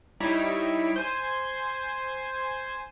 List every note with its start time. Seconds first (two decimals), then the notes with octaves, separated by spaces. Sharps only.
0.20 G3 D#4 E4 C#5 B6 D7
0.96 C5 G#5